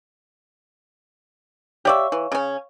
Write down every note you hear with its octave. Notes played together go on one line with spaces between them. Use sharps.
G4 C#5 D5 E5 F5 C#6
E3
C#3 C#4